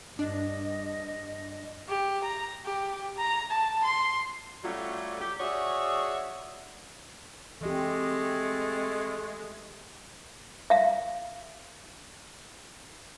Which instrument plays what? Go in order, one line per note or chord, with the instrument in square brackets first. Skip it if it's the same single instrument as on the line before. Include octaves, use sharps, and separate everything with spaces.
[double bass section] G2 [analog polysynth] D4 [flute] D#5
[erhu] G4
A#5
G4
A#5
A5
C6
[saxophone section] F#3 G3 A3 C#4 F4
G4
F#4 G#4 C#5 D5 E5
[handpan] E3 G4 [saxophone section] G#3 A3 D#5 [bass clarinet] C4
[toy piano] E5 F5